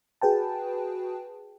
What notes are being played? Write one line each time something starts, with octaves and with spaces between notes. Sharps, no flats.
F#4 G#4 B4 G5 A5